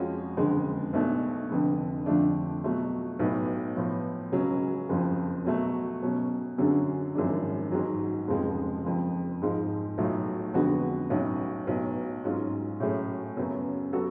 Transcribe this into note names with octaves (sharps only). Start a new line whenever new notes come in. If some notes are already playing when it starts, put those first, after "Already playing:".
Already playing: F2 F3 G#3 C#4 F#4
F#1 F2 D3 G#3
B1 B2 A3 D4
F1 F2 D3
F2 D3 F3 A3 D4
B2 F#3 A3 F4
B1 A2 F#3 B3
A2 F3 B3
C#2 C#3 F#3 C#4
F#1 F2 F3
B2 F#3 A3
B2 F#3 C#4
F#2 D3 F#3 C#4 G#4
G#1 F#2 F3 G#3 D4
A1 G#2 F#3
F1 F2 C#3 F3 G#3
F#1 F2 F3
G#2 F3 G#3
B1 A2 F#3 A3 F4
F2 D3 G#3 B3 F#4
B1 A2 F#3 C#4 F#4
B1 A2 F#3 B3
G#2 F#3 C#4 F4
A2 F#3 A3 C#4 G#4
F#2 C#3 F#3 B3
F#3 B3 F#4 A4